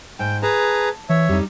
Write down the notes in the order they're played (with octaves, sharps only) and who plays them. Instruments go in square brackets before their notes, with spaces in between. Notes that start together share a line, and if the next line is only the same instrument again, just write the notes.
[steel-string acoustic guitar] G#2 [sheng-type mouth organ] G5
[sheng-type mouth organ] G#4 B4 A#5 [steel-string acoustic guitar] A5
[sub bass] E3 [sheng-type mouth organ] C#5 E5
[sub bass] F2 [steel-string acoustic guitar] G3 D#4